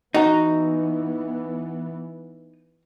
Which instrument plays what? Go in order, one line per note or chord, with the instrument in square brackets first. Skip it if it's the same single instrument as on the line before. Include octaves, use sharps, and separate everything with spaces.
[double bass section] E3 B3 [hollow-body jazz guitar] D#4 [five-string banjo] F#4 A#5